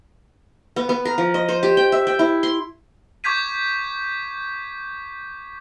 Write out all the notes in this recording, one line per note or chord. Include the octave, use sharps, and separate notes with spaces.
B3
B3
A#4
F3
D#5
C5
G4
G5
E5
G5
E4
C6
C#6 D6 G6 G#6 B6 D#7